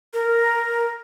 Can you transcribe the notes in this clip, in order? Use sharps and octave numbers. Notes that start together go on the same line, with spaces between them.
A#4